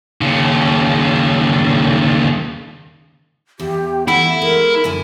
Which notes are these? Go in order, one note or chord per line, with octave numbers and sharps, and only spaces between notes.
D#2 C#3
E2 G4
E3 A3 E4 F#5
G#3 A#4
F#2 D3 G#5